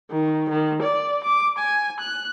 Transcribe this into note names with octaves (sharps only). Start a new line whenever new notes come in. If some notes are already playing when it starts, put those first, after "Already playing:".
D#3
D#3
D5
D6
G#5
F#6